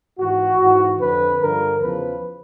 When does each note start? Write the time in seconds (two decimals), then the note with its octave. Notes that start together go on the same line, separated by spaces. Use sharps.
0.18 G#2 E3 F#4
0.60 G#2 E3
0.99 F2 D3 F3 B4
1.40 G2 D3 F3 A#4
1.81 E2 C#3 F3 B4